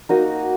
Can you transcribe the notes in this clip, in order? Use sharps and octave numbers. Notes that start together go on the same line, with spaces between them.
A#3 D#4 F#4 D#5